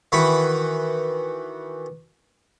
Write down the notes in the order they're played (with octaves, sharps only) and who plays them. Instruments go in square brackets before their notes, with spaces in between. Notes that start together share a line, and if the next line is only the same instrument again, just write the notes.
[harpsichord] D#3 E3 F#4 B4 F#5 B5